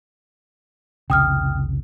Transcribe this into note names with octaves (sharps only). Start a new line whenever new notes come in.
F1 C2 C#3 G5 D#6 F6